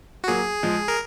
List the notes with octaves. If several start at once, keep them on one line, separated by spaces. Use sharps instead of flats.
F#4
F#3 A#3 G#4
F3 G#3
A#4